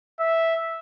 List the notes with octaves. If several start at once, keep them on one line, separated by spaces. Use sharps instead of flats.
E5